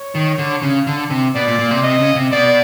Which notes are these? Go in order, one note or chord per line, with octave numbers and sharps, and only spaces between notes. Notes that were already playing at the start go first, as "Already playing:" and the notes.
Already playing: C#5
D#3
D3
C#3
D3
C3
B2 D5
A#2
A#2
C3
C3 D#5
C#3
C3
B2 D5